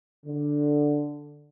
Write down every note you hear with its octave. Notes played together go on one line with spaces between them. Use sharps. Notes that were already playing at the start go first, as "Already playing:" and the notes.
D3